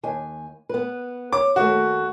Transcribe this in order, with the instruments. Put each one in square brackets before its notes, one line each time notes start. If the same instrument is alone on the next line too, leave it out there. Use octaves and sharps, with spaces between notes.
[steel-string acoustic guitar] D#2 G#5
B3 B4
[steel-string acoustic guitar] C#5 [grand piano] D6
[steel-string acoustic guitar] D#2 A3 [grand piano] F#4